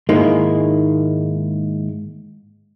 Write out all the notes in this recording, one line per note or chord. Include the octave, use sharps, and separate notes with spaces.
G#2 D#3 G#3 A#3 E4